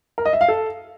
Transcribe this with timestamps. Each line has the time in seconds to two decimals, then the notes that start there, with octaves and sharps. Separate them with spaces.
0.18 A#4
0.25 D#5
0.33 E5
0.41 F5
0.48 A4